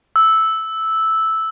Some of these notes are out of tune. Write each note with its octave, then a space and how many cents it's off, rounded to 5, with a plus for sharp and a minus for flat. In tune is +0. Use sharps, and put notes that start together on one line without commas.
E6 -10